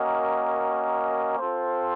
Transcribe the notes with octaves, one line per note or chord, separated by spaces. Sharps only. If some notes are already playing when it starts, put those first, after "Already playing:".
Already playing: A#3 C#4 F#4 A#4 D#5
C4 F4 A4 C5